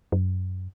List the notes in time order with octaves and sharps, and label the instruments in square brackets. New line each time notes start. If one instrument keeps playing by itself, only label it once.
[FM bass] F#2